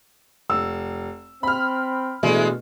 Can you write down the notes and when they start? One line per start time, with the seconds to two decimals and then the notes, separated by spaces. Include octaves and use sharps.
0.50 F1 E6
1.43 C4 B5 F6
2.23 B2 E3 G#3 A3 D4